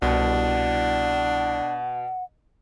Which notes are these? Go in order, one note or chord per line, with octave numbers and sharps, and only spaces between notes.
C2 B2 D4 F#5